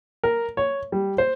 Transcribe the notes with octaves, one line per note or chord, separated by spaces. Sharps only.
A#4
C#5
G3
C5